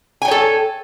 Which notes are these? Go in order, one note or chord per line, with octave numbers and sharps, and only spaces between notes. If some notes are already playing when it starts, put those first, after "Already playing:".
A4 C#5 G5 G#5